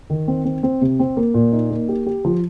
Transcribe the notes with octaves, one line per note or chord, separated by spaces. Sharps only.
D#3
C4
C4
C4
C3
C4
A#3
A#2
D#4
A#3
G4
G4
F3